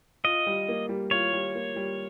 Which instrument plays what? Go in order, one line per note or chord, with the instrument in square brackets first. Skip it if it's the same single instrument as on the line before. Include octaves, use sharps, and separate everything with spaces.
[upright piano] F4 [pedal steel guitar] D#5
[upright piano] G3
A#3
G3
[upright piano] F4 [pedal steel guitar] C#5
[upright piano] G3
A#3
G3